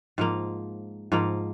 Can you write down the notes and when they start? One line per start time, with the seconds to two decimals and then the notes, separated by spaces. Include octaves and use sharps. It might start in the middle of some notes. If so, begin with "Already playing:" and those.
0.18 G#2 F3 A#3
1.12 G#2 F3 A#3